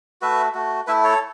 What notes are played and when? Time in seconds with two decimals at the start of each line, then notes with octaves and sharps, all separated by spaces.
0.21 A3 F#4 B4 E5
0.54 A3 F#4
0.87 A3 E4 B4 E5
1.04 A4 C#5